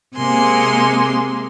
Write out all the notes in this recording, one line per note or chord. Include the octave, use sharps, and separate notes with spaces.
C3 G#3 A#3 G#5 C6